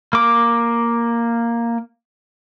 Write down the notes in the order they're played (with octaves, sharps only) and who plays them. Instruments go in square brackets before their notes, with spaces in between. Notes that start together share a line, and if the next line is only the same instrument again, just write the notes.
[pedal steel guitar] A#3 D6